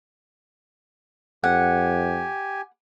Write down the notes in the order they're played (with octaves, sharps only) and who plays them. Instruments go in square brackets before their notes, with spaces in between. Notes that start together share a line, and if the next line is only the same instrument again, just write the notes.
[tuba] F2 [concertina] G4 G#5 [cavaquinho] F#5